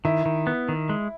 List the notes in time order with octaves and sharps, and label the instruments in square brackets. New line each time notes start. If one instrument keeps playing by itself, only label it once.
[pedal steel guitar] D#3 [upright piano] E4
[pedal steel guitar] D#3
B3
D#3
G#3